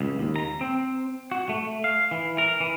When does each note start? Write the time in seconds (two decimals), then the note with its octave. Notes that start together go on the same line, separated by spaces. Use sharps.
0.01 C#2
0.19 D#2
0.36 A#5
0.61 C4
1.31 F#4
1.49 A3
1.84 F5
2.11 E3
2.38 A#4
2.60 E3